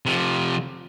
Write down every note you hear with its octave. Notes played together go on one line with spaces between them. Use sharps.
C3 F3